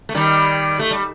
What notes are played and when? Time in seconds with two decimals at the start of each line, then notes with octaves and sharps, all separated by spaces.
0.09 A3
0.15 D#3 G3
0.79 A3
0.91 G3